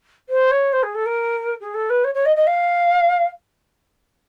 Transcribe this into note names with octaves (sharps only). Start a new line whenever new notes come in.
C5
C#5
C5
G#4
A4
A#4
G#4
A4
B4
C#5
C#5
D#5
D#5
F5